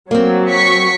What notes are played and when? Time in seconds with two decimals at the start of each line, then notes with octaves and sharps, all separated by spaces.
0.11 F#3 A#3 C4
0.51 C#6 B6 C#7